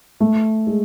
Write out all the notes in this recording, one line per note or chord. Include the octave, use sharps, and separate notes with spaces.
A3
G#3